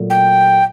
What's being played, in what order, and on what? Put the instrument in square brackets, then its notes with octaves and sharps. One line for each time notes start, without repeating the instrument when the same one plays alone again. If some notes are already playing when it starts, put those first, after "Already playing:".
Already playing: [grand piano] A#2 F#3 A3
[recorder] G5